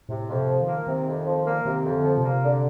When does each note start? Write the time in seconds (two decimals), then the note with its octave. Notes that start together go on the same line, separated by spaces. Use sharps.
0.08 A2 C3
0.28 F2
0.35 C3
0.48 F3
0.61 D#3
0.67 A#3
0.87 C3 D#3
1.07 F2
1.25 F3
1.46 A#3
1.65 C3 D#3
1.84 F2
1.91 D3
2.04 F3
2.18 C3
2.24 A#3
2.44 D3